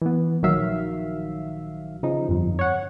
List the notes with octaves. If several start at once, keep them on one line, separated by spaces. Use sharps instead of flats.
E3 B3
A#1 D#3 F#3 E5 F5
C#3 F3 D#4
G1 F2
C#5 F#5